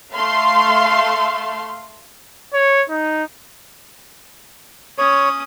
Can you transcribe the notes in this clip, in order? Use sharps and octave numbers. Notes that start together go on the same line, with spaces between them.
A3 F5 C6
C#5
D#4
C#4 C#5 D#6